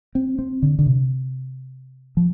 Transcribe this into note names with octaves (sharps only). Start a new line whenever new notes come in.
C4
C4
D3
D3
C3
F3